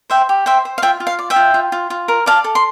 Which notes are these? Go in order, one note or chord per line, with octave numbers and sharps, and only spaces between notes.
C5 E5 G5
G4
C5 E5 G5
C5
F5
F4 E5 G5
F4
F5
D5
E5 G5
F4
F4
F4
F4
A#4
D5 F5 A5
A4
C6